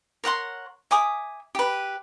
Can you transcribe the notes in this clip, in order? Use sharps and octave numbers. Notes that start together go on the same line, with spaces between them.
A#4 C#5 F#5 C6
E5 G#5 D6 D#6
G4 B4